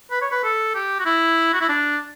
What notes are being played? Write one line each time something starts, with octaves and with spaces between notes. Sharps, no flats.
B4
C#5
B4
A4
G4
F#4
E4
F#4
E4
D4